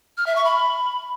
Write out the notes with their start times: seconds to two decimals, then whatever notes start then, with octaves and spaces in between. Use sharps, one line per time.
0.17 F6
0.26 E5
0.36 C#6
0.45 B5